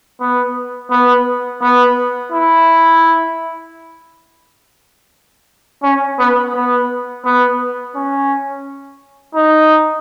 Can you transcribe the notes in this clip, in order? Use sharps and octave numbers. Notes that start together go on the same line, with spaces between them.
B3
B3
B3
E4
C#4
B3
B3
B3
C#4
D#4